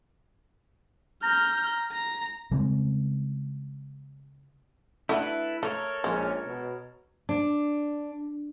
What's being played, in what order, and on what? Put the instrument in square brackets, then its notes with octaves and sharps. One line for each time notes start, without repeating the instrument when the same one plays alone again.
[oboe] A#5 [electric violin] F6 G6
[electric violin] A#5
[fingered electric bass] C#3 G3 G#3 C4
[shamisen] A3 D4 F#4 [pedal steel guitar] E4 A4 B4
[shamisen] A3 [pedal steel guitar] A4 A#4 C#5
[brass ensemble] A#1 C#4 [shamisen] G#3
[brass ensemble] B2
[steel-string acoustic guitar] D4